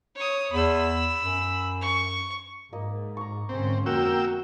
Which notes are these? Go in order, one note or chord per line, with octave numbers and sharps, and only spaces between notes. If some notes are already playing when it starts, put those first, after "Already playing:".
C#5 D#6
E2 B5 E6
F#2
C#6
G#2 A#3 D#5
A#5 C#6
G#2 D3 C4 C#4
F2 A#3 F#4 A#4 G5 E6